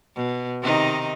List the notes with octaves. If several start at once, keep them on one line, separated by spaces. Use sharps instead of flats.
B2
C3 D#3 D#4